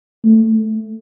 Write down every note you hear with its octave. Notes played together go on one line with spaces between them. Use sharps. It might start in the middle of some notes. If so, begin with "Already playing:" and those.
A3